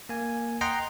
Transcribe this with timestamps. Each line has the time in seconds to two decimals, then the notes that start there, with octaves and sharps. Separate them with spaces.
0.09 A#3 G#5
0.61 D#5 F#5 G5 A#5 C6